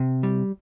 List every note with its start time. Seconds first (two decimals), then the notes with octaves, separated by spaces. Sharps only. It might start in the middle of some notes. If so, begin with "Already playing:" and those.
Already playing: C3
0.23 G3